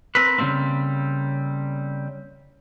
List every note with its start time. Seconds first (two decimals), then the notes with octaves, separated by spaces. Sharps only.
0.15 C4 A#4 B4
0.38 C#3 F#3 G3 A#3 C4